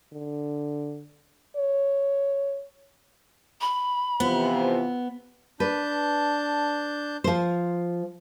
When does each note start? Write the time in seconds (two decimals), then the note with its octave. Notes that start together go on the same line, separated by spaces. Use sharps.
0.13 D3
1.56 C#5
3.61 B5
4.20 C3 E3 F3 B3
5.60 D4 B4 A5 G6
7.24 F3 C5